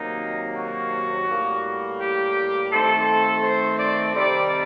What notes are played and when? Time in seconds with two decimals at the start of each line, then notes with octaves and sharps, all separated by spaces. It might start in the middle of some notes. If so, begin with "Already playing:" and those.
Already playing: C3 D#3 F#3 A#3 D#4
0.56 F#4
1.28 A2 G3 A#3
2.01 G4
2.72 D#3 A3 C4 A4
3.44 C5
3.79 D5
4.15 C3 D#3 G3 C4 D5